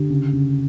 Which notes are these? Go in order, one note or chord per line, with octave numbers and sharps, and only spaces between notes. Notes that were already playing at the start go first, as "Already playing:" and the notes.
Already playing: D3 G4
C#3
C#3